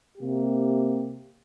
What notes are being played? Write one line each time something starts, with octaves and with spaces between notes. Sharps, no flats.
C3 A#3 G4